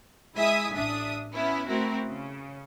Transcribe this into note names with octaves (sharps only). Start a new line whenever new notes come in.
G#3 E4 E5 G#5 D#6 B6
A1 D4 E5 D#6
B3 C#4 E4
A3 C4 E4 F#4 A#4
C#3